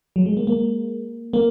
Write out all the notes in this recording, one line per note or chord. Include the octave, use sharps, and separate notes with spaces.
F#3
G#3
A#3
A#3
A#3